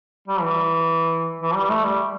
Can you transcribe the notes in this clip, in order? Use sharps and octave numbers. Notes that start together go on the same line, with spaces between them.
G3
E3
E3
G3
A3
G3